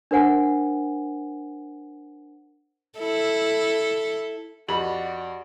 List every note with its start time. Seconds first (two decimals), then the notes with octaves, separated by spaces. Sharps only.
0.11 D4 A#4 C5 F#5 G#5
2.99 E4 A4
4.69 F2 F#4 G4 B4 D5 D#5 B5 F#7